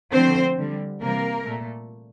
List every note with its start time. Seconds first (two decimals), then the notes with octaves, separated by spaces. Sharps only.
0.12 D3 F3 A3 C4 C5
0.57 D3 G3
1.02 C3 E3 G3 A#3 A#4
1.47 A#2 A3